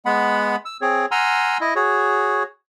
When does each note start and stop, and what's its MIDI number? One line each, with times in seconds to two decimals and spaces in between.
0.06 0.56 56
0.06 0.56 59
0.06 0.56 78
0.06 0.56 83
0.65 0.77 88
0.82 1.06 60
0.82 1.06 68
0.82 1.06 73
1.11 1.58 78
1.11 1.58 80
1.11 1.58 82
1.11 1.58 84
1.11 1.58 88
1.11 1.58 89
1.61 1.74 64
1.61 1.74 75
1.76 2.43 66
1.76 2.43 68
1.76 2.43 73